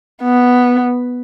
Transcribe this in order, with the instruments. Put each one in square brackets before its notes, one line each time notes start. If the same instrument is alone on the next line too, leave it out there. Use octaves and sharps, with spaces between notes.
[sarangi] B3